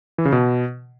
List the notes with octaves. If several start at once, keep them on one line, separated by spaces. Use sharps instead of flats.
E3
C#3
B2